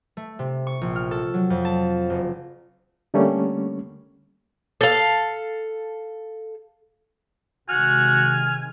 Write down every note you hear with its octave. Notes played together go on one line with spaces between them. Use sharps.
A3
C3
C#6
A#1
F6
A4
F#3
F2
A5
F#1
D3 G3 A3 A#3 C#4
A4 F5
C3 D#3 G#3 F#4 G#5 F6